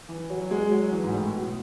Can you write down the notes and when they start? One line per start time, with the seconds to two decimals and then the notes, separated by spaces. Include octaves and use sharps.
0.09 E3
0.30 F#3
0.51 G#3
0.71 F#3
0.92 E3
1.03 G#2
1.13 A2
1.34 B2